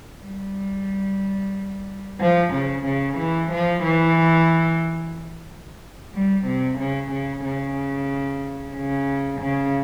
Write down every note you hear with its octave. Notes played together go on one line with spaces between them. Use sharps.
G3
F3
C#3
C#3
E3
F3
E3
G3
C3
C#3
C#3
C#3
C#3
C#3